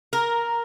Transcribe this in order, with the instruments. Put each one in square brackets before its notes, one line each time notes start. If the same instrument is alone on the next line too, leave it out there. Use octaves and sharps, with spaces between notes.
[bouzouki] A#4